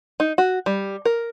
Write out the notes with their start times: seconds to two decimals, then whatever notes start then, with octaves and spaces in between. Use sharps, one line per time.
0.20 D#4
0.38 F#4
0.66 G3
1.05 A#4